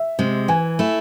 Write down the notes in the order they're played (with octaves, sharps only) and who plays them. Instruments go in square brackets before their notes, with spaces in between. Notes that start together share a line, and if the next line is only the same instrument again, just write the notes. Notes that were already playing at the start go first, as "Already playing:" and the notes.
Already playing: [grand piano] E5
[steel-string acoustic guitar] C3 G#3
[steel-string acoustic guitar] E3 [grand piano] G#5
[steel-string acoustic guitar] A3 E4